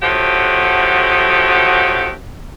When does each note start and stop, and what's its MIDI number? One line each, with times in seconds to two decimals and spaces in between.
0.02 2.12 50
0.02 2.12 53
0.02 2.12 54
0.02 2.12 57
0.02 2.12 66
0.02 2.12 67